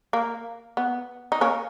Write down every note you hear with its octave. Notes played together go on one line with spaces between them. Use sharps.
A#3
B3
D#4
A#3 C#4